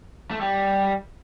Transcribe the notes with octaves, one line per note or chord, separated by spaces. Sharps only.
A3
G3